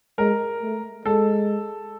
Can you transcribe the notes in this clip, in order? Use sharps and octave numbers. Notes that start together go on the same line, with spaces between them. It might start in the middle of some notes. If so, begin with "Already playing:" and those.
G#3 A#4
A3
G#3 A4